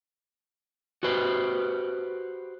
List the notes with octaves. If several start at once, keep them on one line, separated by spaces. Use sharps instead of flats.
F#4 G4 B4 C5